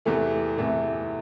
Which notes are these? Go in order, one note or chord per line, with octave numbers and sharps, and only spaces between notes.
E2 C3 E3 A3
E2 C3 E3 A3